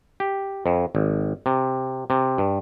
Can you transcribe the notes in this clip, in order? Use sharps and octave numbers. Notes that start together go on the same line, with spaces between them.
G4
F2
G#1
C3
C3
G2